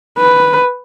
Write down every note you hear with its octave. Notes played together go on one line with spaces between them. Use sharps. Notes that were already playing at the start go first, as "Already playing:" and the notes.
B4